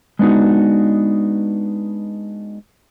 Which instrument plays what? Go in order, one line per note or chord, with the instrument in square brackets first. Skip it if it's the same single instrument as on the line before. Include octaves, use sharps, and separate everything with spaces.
[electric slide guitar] G#3 B3 D4 D#4 F#4